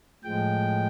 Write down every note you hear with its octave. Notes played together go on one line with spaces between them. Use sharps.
A2 F3 G#3 G5